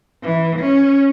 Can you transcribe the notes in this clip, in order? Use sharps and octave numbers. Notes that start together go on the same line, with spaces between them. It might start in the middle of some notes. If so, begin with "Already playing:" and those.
E3
C#4